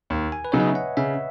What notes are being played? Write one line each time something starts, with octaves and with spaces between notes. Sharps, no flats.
D#2
G#5
B4
C#3 F#3 B3 D#4 C#5
D#5
E5
F#5
C#3 E5